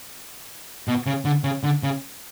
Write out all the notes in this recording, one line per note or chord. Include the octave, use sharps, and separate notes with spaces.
B2
C#3
D3
C#3
D3
C#3